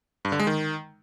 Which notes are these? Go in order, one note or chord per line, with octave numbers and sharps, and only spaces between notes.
G2
D3
G#3
D#3